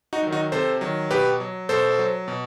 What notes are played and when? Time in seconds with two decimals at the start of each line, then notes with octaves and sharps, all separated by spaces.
0.13 D#4 F#4
0.23 D#3 F#3
0.32 D#4 F#4
0.52 C3 A4 C5
0.81 D#3 F#3
1.10 B2 G4 B4
1.40 F#3
1.69 B2 A4 C5
1.99 F#3
2.28 B2